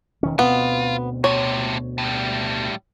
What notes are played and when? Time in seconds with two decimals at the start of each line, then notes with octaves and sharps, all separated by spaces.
0.23 E1 D#3 C#4
0.39 D2 B2 B3 C4 F4
1.24 A2 C3 C#5
1.98 A2 G3